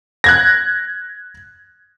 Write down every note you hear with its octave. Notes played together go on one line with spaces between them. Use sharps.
F#6 G#6 A#6